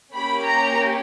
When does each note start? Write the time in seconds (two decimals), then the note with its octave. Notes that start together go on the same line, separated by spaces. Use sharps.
0.14 A#3 C#4 G4 B5
0.44 A#5